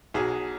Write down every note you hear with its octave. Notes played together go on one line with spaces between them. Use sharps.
B1 B2 F#3 G#4